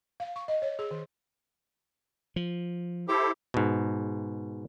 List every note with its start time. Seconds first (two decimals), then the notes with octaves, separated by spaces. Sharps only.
0.20 F5
0.36 C#6
0.48 D#5
0.62 C#5
0.79 G#4
0.91 D#3
2.36 F3
3.09 E4 G4 A4 C5
3.54 G#2 B2